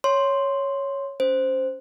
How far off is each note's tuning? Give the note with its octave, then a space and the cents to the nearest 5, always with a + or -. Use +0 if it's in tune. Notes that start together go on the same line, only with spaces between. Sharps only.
C#5 +0 C6 +0
C#4 +15 C5 -5